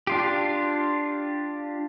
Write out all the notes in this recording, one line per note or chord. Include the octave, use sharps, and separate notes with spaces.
D4 F4 G4